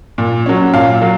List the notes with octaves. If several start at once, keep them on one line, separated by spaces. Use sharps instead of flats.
A#2
F#3 C#4
A#2 F5
F#3